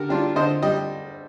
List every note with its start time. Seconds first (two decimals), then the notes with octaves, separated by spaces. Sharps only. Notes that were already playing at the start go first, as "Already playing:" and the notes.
Already playing: D3 G4 A#4
0.09 G3 D4 F4
0.36 D3 C5 D#5
0.62 G3 D#5